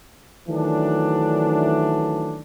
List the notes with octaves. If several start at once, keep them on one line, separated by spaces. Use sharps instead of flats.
D#3 E3 F#3 A3 D4